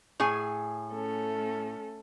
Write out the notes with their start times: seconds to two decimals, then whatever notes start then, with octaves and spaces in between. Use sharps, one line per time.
0.20 A2 G#4 G#5
0.93 A3 C#4 A4